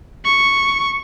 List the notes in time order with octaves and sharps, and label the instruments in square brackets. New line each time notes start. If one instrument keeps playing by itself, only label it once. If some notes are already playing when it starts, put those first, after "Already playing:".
[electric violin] C#6